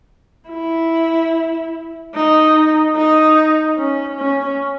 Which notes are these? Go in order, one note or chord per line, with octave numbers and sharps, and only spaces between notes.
E4
D#4
D#4
C#4
C#4